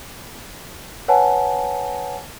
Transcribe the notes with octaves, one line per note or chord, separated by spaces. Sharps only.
B4 C#5 F#5 G#5 A5